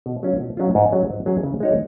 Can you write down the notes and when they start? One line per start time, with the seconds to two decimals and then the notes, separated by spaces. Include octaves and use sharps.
0.06 B2
0.23 F#3 C#4 F4
0.40 B2
0.57 F#3 C#4 F4
0.75 G#2
0.92 F#3 C#4 G#4
1.10 G#2
1.26 F#3 C#4 G#4
1.43 C#3
1.60 G#3 D#4 F#4 C#5